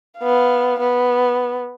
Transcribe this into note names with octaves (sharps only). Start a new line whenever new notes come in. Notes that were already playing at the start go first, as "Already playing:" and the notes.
B3 F5
B3